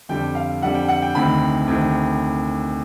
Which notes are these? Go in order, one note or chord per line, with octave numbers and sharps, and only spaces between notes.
F2 D3 G3 G5
F5
F2 D3 G3 F#5
G5
F#5
G5
D2 C3 D#3 B5
D2 C3 D#3